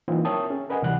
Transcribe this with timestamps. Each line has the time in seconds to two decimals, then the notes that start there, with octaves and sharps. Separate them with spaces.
0.08 E3 F#3 A#3 C4 D#4 F4
0.25 A#4 C#5 E5 G5 A5 D#6
0.50 C#4 G#4
0.70 A#4 B4 D#5 F#5 G#5
0.82 D2 C3 E3 G3 F#5 F#6